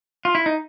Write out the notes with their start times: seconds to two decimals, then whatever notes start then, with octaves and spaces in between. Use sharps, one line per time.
0.25 F4
0.35 E4
0.46 D#4